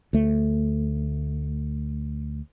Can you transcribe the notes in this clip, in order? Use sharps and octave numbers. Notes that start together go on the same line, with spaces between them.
D2 A3